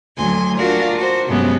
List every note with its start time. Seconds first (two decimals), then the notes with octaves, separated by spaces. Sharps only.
0.15 D2 F#3 G#5 C6
0.58 D4 F4 F#4 A#4 D5
0.96 F#4 C5
1.28 G2 C3 F#3 G#3 B3 C#4